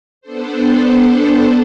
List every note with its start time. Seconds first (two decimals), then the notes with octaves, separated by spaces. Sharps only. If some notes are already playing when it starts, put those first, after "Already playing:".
0.21 B3 D4 A4 C5